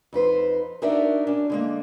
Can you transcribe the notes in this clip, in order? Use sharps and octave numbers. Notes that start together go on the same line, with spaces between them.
F2 D#4 B4 C5
D4 D#4 F#4 A#4 D5 E5
C#4 D4
D3 G#3 A#3